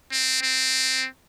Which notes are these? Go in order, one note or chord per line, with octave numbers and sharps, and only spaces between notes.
C4
C4